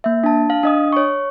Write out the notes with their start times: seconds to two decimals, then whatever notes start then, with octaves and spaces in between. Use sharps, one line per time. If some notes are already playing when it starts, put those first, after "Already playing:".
0.04 A#3 E5
0.24 D4 A5
0.50 F5
0.63 D4 D#5 D#6
0.93 C#5 C#6